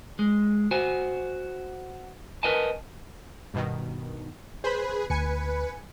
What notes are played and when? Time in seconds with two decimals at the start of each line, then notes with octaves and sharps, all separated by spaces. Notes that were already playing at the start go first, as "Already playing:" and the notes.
0.19 G#3
0.71 F#4 C5 G#5
2.43 A#4 B4 D#5 G#5 A5
3.54 G2 B2 D#3
4.64 G#4 B4 C5 B5
5.10 D2 B4 G#5 C#7